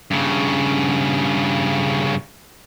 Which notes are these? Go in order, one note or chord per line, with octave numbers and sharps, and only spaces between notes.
G2 C#3